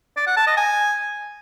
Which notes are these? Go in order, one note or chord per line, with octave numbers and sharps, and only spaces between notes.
D5
F#5
A5
D#5
G#5